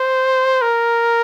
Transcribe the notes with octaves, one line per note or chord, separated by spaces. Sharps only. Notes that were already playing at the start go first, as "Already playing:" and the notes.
Already playing: C5
A#4